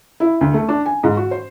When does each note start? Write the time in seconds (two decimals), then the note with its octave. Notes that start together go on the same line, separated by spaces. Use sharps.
0.20 E4
0.41 D2
0.54 A3
0.69 D4
0.86 G#5
1.03 G#2
1.17 F#4
1.31 C5